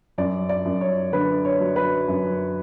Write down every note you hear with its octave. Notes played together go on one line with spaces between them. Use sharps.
F#2 D5
D5
F#2
C#5
D3 B4
C#5
F#3
B4
F#2